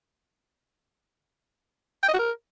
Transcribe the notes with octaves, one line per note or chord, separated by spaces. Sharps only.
G5
D#5
F#4
A#4